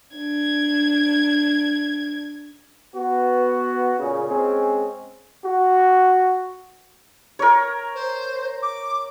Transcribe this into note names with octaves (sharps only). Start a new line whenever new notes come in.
D4 G#6
B3 F#4
A#2 C#3
G#3 C4 C#4 G#4
F#4
A#4 C#5
C5
D6